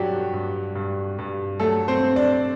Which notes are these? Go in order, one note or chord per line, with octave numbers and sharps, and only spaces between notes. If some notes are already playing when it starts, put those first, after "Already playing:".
Already playing: G2 F#3 D4 F#4 G4
G2
G2
G2
F#3 A3 A4
C4 C5
C4
D4 D5